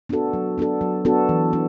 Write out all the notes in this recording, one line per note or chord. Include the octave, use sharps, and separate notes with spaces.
B3 D4 F#4 A4
F#3
B3 D4 F#4 A4
F#3
B3 D4 F#4 A4
E3
D4